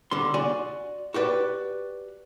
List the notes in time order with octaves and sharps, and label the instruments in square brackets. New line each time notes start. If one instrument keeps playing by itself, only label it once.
[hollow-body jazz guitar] D3 G3 C6
F#4 D5 G#5
F#4 G4 B4 D5